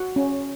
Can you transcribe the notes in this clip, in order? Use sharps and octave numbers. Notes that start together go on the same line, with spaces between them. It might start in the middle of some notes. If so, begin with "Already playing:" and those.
Already playing: F#4 F#5
C#4